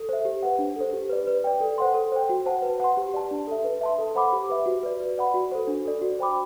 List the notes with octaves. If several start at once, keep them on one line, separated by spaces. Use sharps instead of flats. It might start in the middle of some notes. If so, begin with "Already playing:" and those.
Already playing: A4
C5 E5
G4
B4 F#5
D4
A4 C5
G4
B4 D5
B4
D5 G5
A4
C5 F#5 C6
A4
C5 G5
F#4
C5 F#5 A5
B4
F#5 C6
G4
D5 A5
D4
A4 E5
B4
E5 A5 C6
A4
C5 F#5 B5 D6
G4
B4 E5
F#4
B4 D5
B4
D5 F#5 B5
F#4
A4 C5
D4
A4 D5
F#4
C5 G5 B5 D6